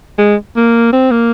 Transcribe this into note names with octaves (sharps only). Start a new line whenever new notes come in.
G#3
A#3
C4
A#3